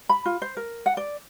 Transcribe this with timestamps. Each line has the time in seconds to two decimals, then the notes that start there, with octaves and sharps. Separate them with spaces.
0.09 B5
0.26 F4
0.42 C5
0.57 A#4
0.86 F#5
0.97 D5